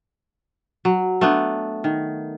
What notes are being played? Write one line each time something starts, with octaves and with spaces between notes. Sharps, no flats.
F#3
A3 B3 D4
D#3